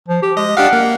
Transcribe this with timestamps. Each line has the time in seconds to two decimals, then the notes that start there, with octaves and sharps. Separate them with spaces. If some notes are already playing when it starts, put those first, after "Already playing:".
0.08 F3
0.22 G4
0.37 G#3 D#5
0.57 D4 G4 F5 F#5
0.73 A#3